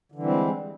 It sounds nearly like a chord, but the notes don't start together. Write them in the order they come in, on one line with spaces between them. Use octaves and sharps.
D3 E3 G3 C4 G#3